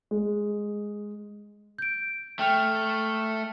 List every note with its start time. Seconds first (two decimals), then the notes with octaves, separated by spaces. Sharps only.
0.11 G#3
1.78 G6 D7
2.39 A3 G5 F6 F7